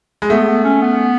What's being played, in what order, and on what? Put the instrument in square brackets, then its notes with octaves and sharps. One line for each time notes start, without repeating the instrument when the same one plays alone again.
[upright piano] G#3
[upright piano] A3 [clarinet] B3
[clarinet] B3
C#4
B3